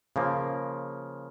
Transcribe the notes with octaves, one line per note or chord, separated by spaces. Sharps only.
C#3 F3 A#3